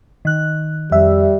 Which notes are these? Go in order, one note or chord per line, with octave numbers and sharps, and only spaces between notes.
D#3 F#6
F2 G3 E5